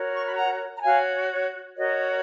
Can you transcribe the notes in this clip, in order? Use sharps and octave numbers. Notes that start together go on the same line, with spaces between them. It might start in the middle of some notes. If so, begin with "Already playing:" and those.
Already playing: F#4 A#4 C#5
C#6
B5
F#5 A#5
A#5
F#4 C#5 F5 G#5
C#5
F#4 A#4 C#5 D#5